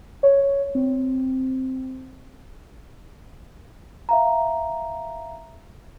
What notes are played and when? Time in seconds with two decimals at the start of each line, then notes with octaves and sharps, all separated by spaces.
0.23 C#5
0.75 C4
4.09 E5 F5 A#5